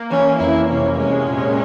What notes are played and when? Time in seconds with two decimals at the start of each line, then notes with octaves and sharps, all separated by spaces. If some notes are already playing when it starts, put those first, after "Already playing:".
Already playing: A#3
0.11 E3 C#4
0.39 F2 E4
0.69 C3 C#4
0.98 G#3 C#4
1.27 A#2